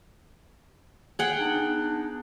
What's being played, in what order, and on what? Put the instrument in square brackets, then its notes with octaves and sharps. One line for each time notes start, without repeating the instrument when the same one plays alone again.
[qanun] G#4 F#5 G5
[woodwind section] B3 D4 D#4